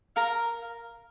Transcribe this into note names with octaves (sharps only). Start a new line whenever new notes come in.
A#4 F5 A#5